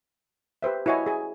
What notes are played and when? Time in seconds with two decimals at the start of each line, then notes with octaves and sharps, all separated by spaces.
0.63 G4 B4 C5 E5
0.86 E4 F#4 C#5 D#5 G#5
1.06 G#4 G#5